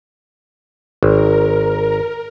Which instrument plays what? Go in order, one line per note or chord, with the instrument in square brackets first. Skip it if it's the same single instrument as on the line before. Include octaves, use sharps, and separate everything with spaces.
[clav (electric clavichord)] G#1 [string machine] A#4